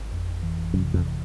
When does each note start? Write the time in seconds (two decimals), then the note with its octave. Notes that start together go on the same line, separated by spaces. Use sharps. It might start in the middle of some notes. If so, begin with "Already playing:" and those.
Already playing: G#1
0.12 F2
0.43 E3
0.74 F#2 C3
0.94 F2